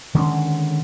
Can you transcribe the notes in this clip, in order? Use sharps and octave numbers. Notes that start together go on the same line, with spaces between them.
D3 D#3 G#3 C#4